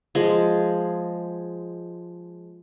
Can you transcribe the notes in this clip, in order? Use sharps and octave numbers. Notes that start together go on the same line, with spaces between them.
F3 G#3